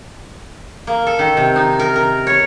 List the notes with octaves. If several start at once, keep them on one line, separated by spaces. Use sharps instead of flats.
A#3
A4
D#3
C3
D#4
A#4
A#4
C#5